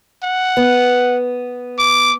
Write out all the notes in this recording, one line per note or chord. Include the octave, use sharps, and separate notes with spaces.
F#5
B3
D6